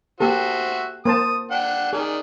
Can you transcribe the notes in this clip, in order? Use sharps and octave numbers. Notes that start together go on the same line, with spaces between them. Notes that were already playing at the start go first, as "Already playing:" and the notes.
A#3 F#4 G4 A4 C5 E5
A#3 C5 A5 D#6
D4 F#5 G5
D#3 G#4 D5